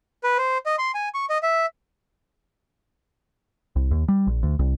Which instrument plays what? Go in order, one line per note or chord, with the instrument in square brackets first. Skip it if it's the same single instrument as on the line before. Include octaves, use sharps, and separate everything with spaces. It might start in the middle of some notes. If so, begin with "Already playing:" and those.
[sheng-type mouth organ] B4
C5
D#5
C6
G#5
C#6
D#5
E5
[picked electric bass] C2
D#2
G3
A#1
D2
C2